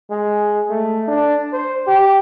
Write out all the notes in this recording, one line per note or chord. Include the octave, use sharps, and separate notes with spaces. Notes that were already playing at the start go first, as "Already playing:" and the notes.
G#3
A3
D4
C5
G4